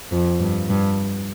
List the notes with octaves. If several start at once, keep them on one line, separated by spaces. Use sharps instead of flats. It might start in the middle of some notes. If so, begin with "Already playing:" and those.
F2
G2
G2